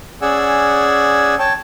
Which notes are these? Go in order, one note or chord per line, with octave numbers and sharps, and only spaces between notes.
C#4 G#4 D5 F#5 G#5 E6
C#5 G5 A5